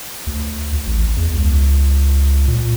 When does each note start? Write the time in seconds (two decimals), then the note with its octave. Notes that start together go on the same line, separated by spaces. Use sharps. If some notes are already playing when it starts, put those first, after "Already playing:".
0.27 D2
0.87 A1
1.17 E2
1.34 C#2
2.48 A#2